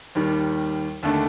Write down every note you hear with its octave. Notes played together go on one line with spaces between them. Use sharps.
D#2 D#3 G3
D#2 D3 A3 D4